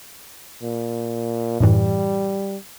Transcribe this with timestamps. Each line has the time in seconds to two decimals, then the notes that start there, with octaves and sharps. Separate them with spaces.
0.63 A#2
1.60 F#2 A2 E3 G3